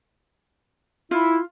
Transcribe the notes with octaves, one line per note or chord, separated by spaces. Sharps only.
E4 F4